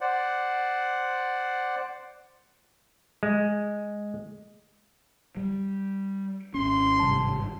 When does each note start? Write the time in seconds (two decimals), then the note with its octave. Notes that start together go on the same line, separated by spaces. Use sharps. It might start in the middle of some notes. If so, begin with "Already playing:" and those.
0.01 C5 D5 F#5
3.23 G#3
5.37 G3
6.54 G#1 C#4 C6
7.00 G#1 G2 C3 A5